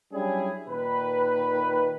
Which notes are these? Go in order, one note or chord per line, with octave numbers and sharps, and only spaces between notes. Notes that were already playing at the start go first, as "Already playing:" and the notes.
F#3 G3 C#4 D4 E4 G#4
A#2 D#3 B4